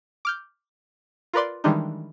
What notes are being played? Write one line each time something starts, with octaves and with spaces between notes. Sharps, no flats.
D6 F6 G6
F4 A#4 B4 D5 C6
D#3 E3 G3 G#3 D4 D#4